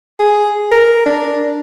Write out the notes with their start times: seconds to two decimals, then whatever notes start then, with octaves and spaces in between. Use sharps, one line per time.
0.20 G#4
0.72 A#4
1.06 D4